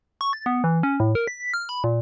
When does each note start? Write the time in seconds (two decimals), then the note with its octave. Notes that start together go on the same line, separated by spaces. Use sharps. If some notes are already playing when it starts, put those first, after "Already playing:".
0.21 C#6
0.33 A6
0.46 B3
0.64 E3
0.83 C#4
1.00 A2
1.15 A#4
1.27 B6
1.40 B6
1.54 F6
1.69 B5
1.84 A#2